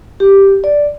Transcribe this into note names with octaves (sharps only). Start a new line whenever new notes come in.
G4
D5